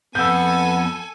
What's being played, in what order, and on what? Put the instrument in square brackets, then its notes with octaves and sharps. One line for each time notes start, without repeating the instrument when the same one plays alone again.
[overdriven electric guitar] F2 [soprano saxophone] B3 [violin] A4 G#5 [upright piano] E6 G6